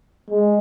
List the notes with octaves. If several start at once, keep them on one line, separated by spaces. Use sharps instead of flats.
G#3